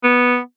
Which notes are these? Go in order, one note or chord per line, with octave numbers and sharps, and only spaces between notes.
B3